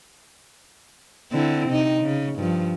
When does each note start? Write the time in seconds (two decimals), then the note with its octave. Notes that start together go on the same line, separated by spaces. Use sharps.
1.32 D3 C4 E4
1.69 C3 D#4
2.02 C#3
2.39 G2 F3